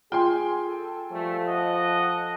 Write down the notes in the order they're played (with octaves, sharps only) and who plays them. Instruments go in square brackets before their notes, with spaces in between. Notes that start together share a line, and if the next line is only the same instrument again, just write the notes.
[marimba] F4 [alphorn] G#4 [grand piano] G5 G#5 C6
[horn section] A4
[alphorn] F3 [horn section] G3 A3
[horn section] A4 D#5 F#5